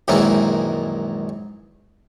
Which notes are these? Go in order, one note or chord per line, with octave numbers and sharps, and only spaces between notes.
A#1 F#2 D#3 E3 G#3